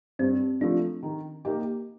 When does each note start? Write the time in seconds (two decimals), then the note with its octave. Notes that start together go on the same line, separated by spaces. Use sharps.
0.19 G2 C4
0.61 F3 A3 D4
1.03 D#3
1.45 A#3 D#4 G4